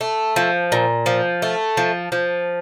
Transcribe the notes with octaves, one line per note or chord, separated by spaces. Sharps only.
A3
F3
A#2
F3
A3
F3
F3